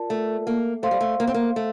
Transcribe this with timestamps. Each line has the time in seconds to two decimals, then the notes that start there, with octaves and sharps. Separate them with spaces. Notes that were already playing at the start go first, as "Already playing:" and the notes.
Already playing: F4 A#4 D5 A5
0.10 A3
0.47 A#3
0.82 A3 C5 F5 C6
0.91 G3
1.00 A3
1.20 A#3
1.27 C4
1.34 A#3
1.56 A3